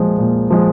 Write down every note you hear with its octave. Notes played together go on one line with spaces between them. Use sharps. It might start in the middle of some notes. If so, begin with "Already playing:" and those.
Already playing: A#2 F3 G#3
A#2
F3 G#3